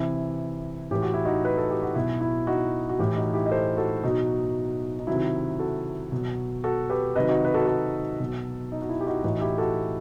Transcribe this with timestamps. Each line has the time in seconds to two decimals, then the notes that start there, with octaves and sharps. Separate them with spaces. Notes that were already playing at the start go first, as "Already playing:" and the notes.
Already playing: C3 E3 E4
0.91 A2 E3 G4
1.02 F#4
1.14 E4
1.25 D#4 F#4
1.45 B4
1.58 A4
1.70 G4
1.82 F#4
1.95 B2 F#3 E4
2.21 E4
2.47 D#4 F#4
2.89 F#4
2.99 A2 E3 E4 G4
3.16 D#4 F#4
3.34 E4 G4
3.46 D#5
3.51 A4 C5
3.77 F#4 A4
4.03 B2 F#3 D#4 F#4
4.99 D#4
5.07 C3 D#3 F#3 E4
5.59 F#4 A4
6.12 B2 F#3
6.64 F#4 A4
6.90 G4 B4
7.15 C3 D#3 F#3 B4 D#5
7.29 D#4 F#4
7.45 B4
7.54 F#4 A4
7.67 F#4 A4
8.20 B2 F#3
8.72 D#4
8.82 F#4
8.89 E4
9.00 G4
9.07 D#4 F#4
9.24 A2 E3 D#4 F#4
9.41 E4 G4
9.58 F#4 A4